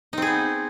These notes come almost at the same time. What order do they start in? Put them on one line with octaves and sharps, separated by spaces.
D#4 C4 G#4 B3